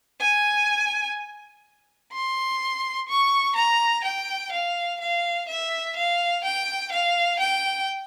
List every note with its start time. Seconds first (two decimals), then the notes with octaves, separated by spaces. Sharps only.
0.20 G#5
2.13 C6
3.09 C#6
3.56 A#5
4.04 G5
4.52 F5
5.01 F5
5.49 E5
5.96 F5
6.44 G5
6.93 F5
7.40 G5